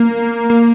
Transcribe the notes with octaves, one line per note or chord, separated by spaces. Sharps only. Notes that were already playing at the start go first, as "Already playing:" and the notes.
Already playing: A#3
A#3